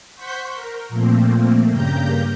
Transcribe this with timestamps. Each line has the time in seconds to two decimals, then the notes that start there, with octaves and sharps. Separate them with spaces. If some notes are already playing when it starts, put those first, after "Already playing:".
0.15 C5 F#5 C6 C#6 G6 B6
0.52 A#4
0.89 A#2 F3 A3 A#3 C4
1.69 G2 C#3 A#3 G4 A#5 G6